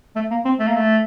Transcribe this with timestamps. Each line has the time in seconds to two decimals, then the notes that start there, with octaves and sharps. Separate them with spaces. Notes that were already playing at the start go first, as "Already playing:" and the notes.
0.16 A3
0.31 A#3
0.45 C4
0.59 A3
0.68 A#3
0.76 A3